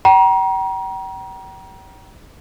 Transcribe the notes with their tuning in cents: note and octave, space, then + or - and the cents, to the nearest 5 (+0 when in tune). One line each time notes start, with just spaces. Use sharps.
G5 -35 A#5 +35